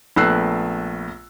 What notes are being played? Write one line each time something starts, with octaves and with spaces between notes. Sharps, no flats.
A#1 A3 B3 E6 F#6 C7